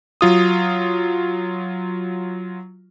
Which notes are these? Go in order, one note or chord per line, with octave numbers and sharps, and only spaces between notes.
F#3 F4 D#6